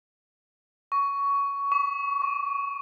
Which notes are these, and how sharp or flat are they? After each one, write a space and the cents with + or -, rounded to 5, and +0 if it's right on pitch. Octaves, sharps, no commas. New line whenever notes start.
C#6 +15
D6 -45
C#6 -35